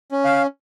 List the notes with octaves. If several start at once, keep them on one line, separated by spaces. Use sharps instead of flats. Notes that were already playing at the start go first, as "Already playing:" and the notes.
C#4
F5